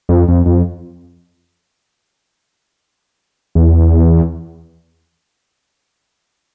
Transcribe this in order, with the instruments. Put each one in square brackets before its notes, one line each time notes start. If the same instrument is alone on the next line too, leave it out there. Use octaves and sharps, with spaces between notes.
[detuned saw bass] F2
F2
F2
E2